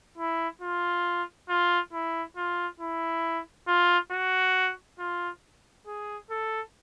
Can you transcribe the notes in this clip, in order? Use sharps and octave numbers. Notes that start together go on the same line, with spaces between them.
E4
F4
F4
E4
F4
E4
F4
F#4
F4
G#4
A4